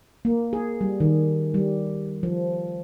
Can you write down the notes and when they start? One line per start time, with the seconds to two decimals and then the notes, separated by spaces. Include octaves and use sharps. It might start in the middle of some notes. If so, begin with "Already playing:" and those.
0.25 A#3
0.53 G#4
0.81 G3
1.00 D#3
1.54 G3
2.23 F3